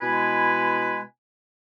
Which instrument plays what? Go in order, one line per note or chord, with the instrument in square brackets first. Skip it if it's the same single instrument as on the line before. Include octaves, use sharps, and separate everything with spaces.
[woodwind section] B2 G#3 E4 B4 G#5